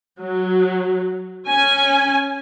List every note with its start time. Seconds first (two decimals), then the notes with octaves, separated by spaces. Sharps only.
0.22 F#3
1.47 C#4 G#5